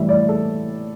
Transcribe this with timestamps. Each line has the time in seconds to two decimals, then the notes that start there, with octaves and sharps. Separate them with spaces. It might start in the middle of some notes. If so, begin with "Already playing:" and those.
Already playing: A2 E3 G3 E5
0.09 D5
0.29 A4